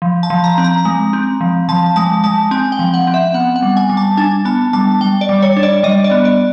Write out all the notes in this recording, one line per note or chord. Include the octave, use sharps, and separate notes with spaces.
F3
A5
F3
A#5
C4
A#5
G#3
C4
F3
F3 A5
G#3 A5
G#3 A5
C4 G#5
G5
F3
F#5
C4
E5
B3 F#5
F#5
G3
G#5
G3
A5
D4 G#5
B3 A5
G3 A5
G3 G5
D5
G3
C#5
D4
D5
G3 D#5
D5
B3
D5